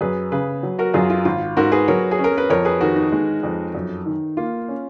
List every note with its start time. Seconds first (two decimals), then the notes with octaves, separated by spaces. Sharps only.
0.01 F#2 G#4 B4
0.32 C#3 G#4 B4
0.63 F#3
0.79 F#4 A#4
0.94 F#2 F4 G#4
1.10 F4
1.25 G#1 F4
1.57 G#2 F#4 A#4
1.72 G#4 B4
1.88 F#3 A#4 C#5
2.11 G#4
2.19 C#4
2.24 A#4
2.38 B4
2.50 F2 A#4 C#5
2.65 G#4 B4
2.81 D#3 F#4 A#4
2.96 D#4
3.12 G#3 D#4
3.43 F2
3.75 F#2
4.06 D#3
4.37 A#3 F4
4.68 C#4